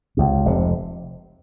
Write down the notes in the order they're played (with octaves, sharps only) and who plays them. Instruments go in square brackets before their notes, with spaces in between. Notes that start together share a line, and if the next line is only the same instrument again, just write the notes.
[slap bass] C#2 C3
F1 F2 C3